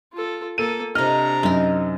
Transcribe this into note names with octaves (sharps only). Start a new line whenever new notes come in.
F4 A4
A#3 A4 D#7
C3 D4 D#5 A#5 F6
F#2 D#4 A#4